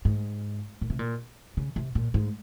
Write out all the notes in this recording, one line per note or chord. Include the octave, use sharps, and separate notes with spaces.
G#2
A#2
C3
A#2
C#3
C3
A#2
G#2